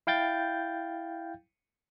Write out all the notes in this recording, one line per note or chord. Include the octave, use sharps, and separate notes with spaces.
E4 F5 G5 G6 A6